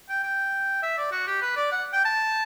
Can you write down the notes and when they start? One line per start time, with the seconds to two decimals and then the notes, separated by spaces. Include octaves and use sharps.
0.09 G5
0.23 G5
0.82 E5
0.97 D5
1.11 F#4
1.27 G4
1.41 B4
1.56 D5
1.72 F#5
1.93 G5
2.05 A5